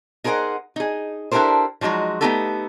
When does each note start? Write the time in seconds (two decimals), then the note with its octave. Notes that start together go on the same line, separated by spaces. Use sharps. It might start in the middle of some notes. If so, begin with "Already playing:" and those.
0.24 D#4 G#4 A#4 C5 F#5
0.76 D#4 G#4
1.32 D4 E4 G4 A4 A#4 C5
1.81 F3 F#3 G#3 D#4 F#4
2.21 A3 B3 C4 D#4 G4 A4